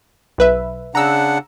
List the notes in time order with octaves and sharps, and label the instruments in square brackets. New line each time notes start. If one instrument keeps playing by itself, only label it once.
[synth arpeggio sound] B1 B4 E5
[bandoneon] C#3 D4 F#5 [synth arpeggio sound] A#5 E6